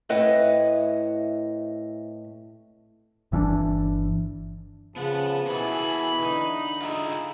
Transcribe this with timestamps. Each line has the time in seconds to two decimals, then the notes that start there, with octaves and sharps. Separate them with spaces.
0.09 A2 C4 E4 B4 D#5 F#5
3.32 G1 E3 C#4 D4
4.96 C#3 F3 B3 F#5 A5
5.47 B2 E3 B3 G#4 A4 B5
6.23 D3 D#4
6.82 D#4 F4 G#4 E5